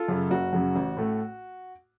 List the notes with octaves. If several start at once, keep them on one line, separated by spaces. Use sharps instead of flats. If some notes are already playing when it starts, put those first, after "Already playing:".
Already playing: F4 A4
F#2 C#3 F#3
F#1 F#4
F#2 C#3 F#3
A1
A2 A3